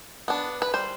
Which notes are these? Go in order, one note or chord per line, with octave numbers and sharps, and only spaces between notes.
B3 D4
B4
G3 C5